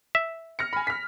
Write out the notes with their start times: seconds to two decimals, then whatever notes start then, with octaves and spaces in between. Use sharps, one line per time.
0.15 E5
0.59 F6 A#6 C#7
0.73 G#5 B5
0.87 F6 B6